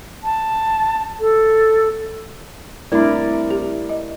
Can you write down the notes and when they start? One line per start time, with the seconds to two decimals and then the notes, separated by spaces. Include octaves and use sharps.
0.24 A5
1.20 A4
2.92 C2 A3 D4 E4 A#4 D5
3.50 G4
3.89 D#5